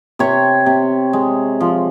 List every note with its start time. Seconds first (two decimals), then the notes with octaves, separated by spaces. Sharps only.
0.19 C3 C#5
0.66 C3
1.13 G#3
1.60 F3